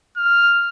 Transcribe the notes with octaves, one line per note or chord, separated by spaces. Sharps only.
F6